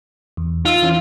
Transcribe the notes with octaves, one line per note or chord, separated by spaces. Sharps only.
E2
D#4 F4 E6
E3 C#4